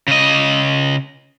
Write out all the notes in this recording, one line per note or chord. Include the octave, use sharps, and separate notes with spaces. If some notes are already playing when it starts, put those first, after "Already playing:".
C#3 D#5